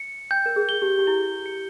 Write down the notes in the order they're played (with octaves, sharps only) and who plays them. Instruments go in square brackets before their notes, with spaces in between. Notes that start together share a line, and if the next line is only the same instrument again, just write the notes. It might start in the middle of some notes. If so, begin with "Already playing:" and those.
Already playing: [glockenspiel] C#7
[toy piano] G5 [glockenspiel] G6
[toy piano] A#4
G#4
[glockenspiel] G7
[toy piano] G4
G4
[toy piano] E4 [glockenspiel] G7
[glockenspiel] C#7